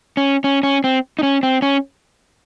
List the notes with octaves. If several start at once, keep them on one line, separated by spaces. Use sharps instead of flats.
C#4
C#4
C#4
C4
D#4
C#4
C4
C#4